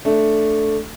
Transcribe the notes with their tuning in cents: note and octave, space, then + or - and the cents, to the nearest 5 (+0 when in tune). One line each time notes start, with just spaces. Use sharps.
A3 +0 D4 +0